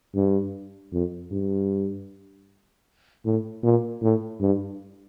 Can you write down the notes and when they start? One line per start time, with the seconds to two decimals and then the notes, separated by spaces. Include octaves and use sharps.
0.15 G2
0.92 F2
1.31 G2
3.25 A2
3.63 A#2
4.02 A2
4.40 G2